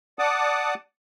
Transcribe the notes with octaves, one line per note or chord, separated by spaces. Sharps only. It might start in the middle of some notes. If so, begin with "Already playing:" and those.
D5 F#5 A5 D6 D#6